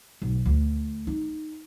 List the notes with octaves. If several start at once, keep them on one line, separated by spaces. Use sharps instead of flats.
B1
D2
D#4